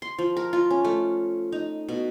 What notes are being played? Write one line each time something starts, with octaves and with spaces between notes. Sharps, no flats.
C6
F3
A#4
F4
C#4
A3
D#4
B2